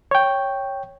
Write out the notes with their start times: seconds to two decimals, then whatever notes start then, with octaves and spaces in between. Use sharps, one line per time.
0.11 C#5 G5